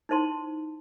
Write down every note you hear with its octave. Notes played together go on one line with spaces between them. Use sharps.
D#4 E4 C5 A5 C6